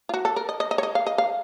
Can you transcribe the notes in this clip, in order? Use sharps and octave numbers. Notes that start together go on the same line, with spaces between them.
F4
F#4
A4
A#4
D#5
D#5
D#5
C#5
D#5
F5
D#5
F5